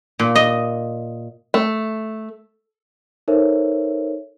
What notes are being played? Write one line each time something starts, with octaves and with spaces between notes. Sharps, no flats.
A#2
D#5
A3
D#4 A4 A#4 C5 C#5 E5